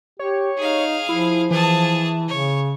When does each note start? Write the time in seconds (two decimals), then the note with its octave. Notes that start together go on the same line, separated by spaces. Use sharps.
0.19 G4 C#5
0.58 D#4 G#4 F5
1.09 F3 E4
1.51 E3 G#4 A5
2.28 C#3 C#5